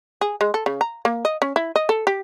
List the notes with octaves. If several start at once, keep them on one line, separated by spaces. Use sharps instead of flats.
G#4
G#3
A4
C#3
A#5
A#3
D#5
C#4
E4
D#5
A4
G4